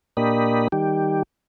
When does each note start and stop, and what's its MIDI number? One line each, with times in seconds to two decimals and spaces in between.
0.17 0.68 46
0.17 0.68 58
0.17 0.68 62
0.17 0.68 67
0.17 0.68 75
0.17 0.68 83
0.72 1.23 51
0.72 1.23 55
0.72 1.23 67